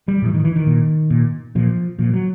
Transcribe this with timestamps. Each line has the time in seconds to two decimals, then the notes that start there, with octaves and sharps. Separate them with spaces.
0.08 G3
0.22 A2 E3
0.34 D#3
0.44 E3
0.56 D#3
0.67 A#2
1.10 A#2
1.55 A#2 F3
1.99 A#2 F3
2.14 F#3